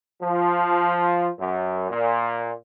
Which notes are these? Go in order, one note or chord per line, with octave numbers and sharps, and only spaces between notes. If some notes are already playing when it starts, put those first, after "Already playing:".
F3
F#2
A#2